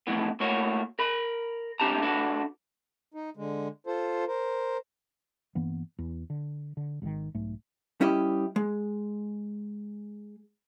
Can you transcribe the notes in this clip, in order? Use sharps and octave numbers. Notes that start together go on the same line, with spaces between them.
F2 A2 E3 B3
A2 A#3 F#4 C#5
A#4 B5
A#2 C4 D4 G4 A5 A#5
D4 F#4 A4 B4
D#4
D3 G#3
F4 A4 C5
A#4 C5
G2 E3 A#3 B3
E2
D3
D3
G#1 G#2 B2 D#3
B1 G#2 A3
G3 C#4 E4 G4 D#5
G#3